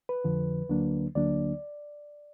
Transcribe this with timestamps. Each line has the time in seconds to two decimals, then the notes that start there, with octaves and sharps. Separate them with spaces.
0.09 B4
0.24 F2 D3 F3
0.69 D2 D3 F#3 A#3 D4
1.15 D2 D3 F#3 A#3 D4 D5